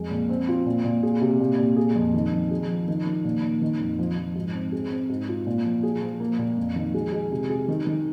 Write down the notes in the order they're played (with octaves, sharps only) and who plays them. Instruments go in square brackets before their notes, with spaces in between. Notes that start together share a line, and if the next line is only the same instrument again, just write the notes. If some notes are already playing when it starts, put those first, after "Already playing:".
Already playing: [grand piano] F2 G#3
A#2
C4
F4
A#2
A#2
G#4
C3
A#2
A#2
G#4
F2
D#3
F2
G#4
F3
D#3
D#3
A#2
A#2
D#3
F2
F3
F3
G#2
C4
G#4
C4
G#2
F4
A#2
F3
G#4
F3
A#3
A#2
F2
D#3
G#3
G#3
C3
G#4
D#3
D#3